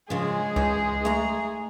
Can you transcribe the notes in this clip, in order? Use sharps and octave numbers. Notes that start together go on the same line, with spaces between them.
C#3 F3 G#3 G#4
C#2 E3 D#4
A3 A#5